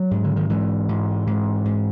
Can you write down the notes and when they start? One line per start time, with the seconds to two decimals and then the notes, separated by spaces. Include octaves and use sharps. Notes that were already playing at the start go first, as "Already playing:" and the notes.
Already playing: F#3
0.11 G#2
0.24 D3
0.36 D#3
0.50 G#2 E3
0.89 G#2
1.27 G#2
1.65 G#2